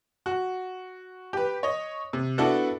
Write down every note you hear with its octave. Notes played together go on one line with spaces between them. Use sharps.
F#4
G4 B4
C#5 D#5
C3
B3 D4 E4 F#4 A4